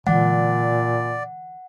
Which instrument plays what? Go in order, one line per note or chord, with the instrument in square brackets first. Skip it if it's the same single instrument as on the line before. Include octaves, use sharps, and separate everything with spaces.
[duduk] A#2 [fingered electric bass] D3 E3 G#3 [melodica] D5 [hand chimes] F#5